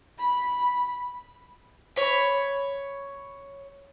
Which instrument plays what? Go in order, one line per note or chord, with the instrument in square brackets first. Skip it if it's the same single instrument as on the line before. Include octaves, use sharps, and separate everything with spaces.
[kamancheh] B5
[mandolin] C#5 B5